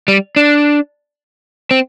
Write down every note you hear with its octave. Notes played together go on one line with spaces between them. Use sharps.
G3
D4
C4